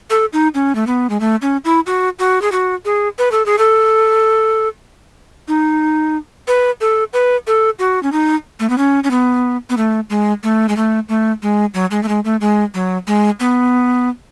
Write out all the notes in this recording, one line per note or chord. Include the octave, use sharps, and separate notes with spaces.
A4
D#4
C#4
A3
B3
G#3
A3
C#4
E4
F#4
F#4
G#4
F#4
G#4
B4
A4
G#4
A4
D#4
B4
A4
B4
A4
F#4
C#4
D#4
A3
B3
C#4
C#4
B3
B3
A3
G#3
A3
G#3
A3
A3
G#3
F#3
G#3
A3
G#3
A3
G#3
F#3
G#3
B3